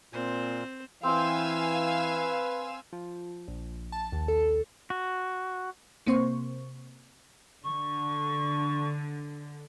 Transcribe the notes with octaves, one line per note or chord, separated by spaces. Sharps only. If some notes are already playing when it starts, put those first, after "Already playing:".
A#2 C4 C5
E3 C4 B4 F5 G5 G#5 E6
F3
A#1
A5
D#2
A4
F#4
C3 A#3 C4 C5 C#6
D3 C#6